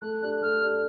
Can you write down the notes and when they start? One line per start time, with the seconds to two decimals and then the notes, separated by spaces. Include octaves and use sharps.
0.02 A3 F#6
0.22 D4 G4 F#6
0.42 A3 F6
0.62 D4 G4